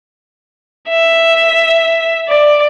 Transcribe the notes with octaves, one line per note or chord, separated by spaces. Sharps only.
E5
D5